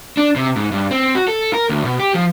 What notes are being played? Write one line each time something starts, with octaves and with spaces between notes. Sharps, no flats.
D4
C3
G#2
G2
C4
F#4
A4
A#4
D2
B2
G4
F3